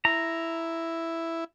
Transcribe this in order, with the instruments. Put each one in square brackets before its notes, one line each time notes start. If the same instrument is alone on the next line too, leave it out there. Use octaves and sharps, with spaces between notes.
[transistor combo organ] E4 [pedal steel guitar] A#5